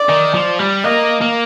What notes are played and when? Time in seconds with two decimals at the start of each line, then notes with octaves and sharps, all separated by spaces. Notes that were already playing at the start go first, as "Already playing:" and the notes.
Already playing: D5
0.09 D#3
0.34 F3
0.59 G3
0.84 A#3 D#5
1.21 A#3